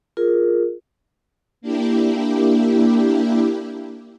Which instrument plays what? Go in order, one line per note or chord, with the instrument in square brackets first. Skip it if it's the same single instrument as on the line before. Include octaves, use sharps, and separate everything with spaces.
[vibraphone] F4 G#4 A#4
[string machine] A#3 D4 E4 G4